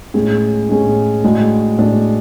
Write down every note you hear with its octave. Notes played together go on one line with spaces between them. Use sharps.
A2 G#3 C#4 G#4
A2 G#3 C#4 G#4
A2 G#3 D4 F#4
A2 G#3 D4 F#4